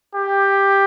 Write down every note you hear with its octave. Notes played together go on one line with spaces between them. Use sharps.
G4